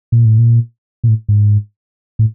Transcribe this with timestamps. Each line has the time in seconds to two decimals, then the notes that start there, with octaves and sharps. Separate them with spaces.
0.12 A#2
0.25 A2
0.38 A#2
1.04 A#2
1.08 A2
1.29 G#2
2.19 A2